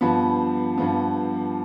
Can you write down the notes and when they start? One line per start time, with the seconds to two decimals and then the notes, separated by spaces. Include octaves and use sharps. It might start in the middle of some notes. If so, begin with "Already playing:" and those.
0.01 G2 F3 B3 B5
0.78 G2 F3 B3